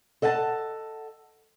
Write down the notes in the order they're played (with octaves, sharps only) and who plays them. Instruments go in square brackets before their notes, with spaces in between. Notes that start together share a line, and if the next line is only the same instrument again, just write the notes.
[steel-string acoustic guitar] A4 D#5 F#5 G#5 A5